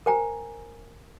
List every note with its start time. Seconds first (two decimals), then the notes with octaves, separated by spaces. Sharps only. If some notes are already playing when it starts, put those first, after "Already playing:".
0.06 A#4 C5 G5 G#5 A#5